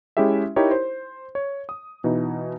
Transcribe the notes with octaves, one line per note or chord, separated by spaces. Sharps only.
G#3 C#4 E4 G4 G#4 E5
D#4 E4 G4 A#4 C#5
C5
C#5
D#6
B2 E3 D#4